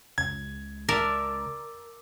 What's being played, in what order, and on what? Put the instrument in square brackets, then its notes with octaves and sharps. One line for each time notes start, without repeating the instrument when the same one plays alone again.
[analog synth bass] C#2 [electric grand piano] G#6
[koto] A#4 [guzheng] D5 E5 A5